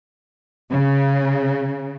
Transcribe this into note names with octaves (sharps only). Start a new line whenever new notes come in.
C#3